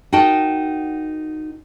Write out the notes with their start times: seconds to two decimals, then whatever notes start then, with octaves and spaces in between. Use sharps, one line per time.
0.13 D#4 F#4 A#4 D#5 G5 A5